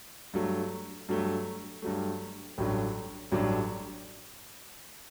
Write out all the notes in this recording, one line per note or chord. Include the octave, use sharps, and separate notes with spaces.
G2 F#3 A3
G2 F#3 A3
G2 F#3 A3
A1 G2 F#3 A3 D4
A1 G2 F#3 A3 D4